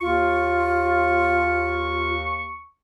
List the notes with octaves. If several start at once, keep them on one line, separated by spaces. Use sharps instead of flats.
D#2 F4 C#6